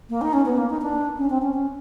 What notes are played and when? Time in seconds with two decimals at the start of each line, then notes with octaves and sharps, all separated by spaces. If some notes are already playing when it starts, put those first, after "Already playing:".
0.10 A#3
0.21 D#4
0.33 C#4
0.46 B3
0.57 A#3
0.70 D#4
0.82 D4
1.18 C#4
1.30 C4
1.42 C#4
1.54 C#4